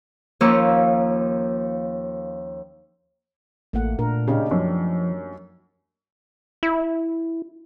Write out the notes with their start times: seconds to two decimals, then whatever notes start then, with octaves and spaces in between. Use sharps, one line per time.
0.41 D#2 F3 A#3 C#4 C#6 E6
3.73 A1 A3 A#3 F#5
3.99 A#2 D4 A#4
4.28 C#3 D4 D#4 G4
4.51 F#2 F3
6.63 E4